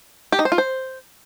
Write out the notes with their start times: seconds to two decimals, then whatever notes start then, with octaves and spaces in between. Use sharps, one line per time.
0.32 G4
0.39 D#4
0.45 C5
0.52 F4
0.58 C5